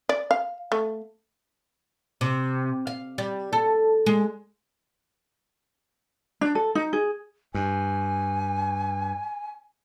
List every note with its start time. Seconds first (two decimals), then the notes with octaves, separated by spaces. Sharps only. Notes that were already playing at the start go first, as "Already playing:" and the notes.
0.09 D5
0.31 F5
0.72 A3
2.21 C3
2.87 F5
3.18 G3
3.53 A4
4.06 G#3
6.41 D4
6.55 A4
6.75 D#4
6.93 G#4
7.54 G2 G#5